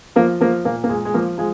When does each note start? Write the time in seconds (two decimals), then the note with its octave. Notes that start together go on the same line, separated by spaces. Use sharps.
0.16 F3 A#3
0.41 F3 A#3
0.65 A#2 A#3
0.84 A#3
0.89 A#2 G#3
1.05 G#3
1.14 F3 A#3
1.38 F3 G#3